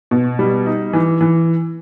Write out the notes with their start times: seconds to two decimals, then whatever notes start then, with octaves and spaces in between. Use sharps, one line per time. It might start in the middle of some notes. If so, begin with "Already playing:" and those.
0.11 B2
0.39 G3
0.66 D#4
0.93 E3
1.21 E3